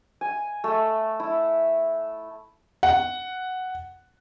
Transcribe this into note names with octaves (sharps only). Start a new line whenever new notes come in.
G#5
A3
E4
F#5